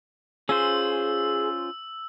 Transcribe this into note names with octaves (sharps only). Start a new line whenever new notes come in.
C#4 F4 G#4 C5 E6